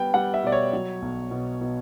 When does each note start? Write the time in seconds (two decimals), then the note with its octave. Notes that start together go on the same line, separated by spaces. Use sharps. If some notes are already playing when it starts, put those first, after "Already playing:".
Already playing: G3 B3 G5
0.14 G3 F#5
0.34 E5
0.43 B2 D5
0.52 C#5
0.73 F#3
1.02 B1
1.31 B2
1.61 B2